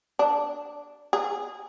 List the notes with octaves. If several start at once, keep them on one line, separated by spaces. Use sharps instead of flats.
D4
G#4